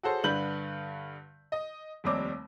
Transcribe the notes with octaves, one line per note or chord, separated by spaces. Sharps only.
F#4 G#4 A4 C5 C#5
G2 D3 B4 G6 F#7
D#5
F1 D#2 G3 C4 C#5 D6